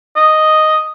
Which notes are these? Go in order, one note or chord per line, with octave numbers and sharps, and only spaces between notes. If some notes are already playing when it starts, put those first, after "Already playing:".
D#5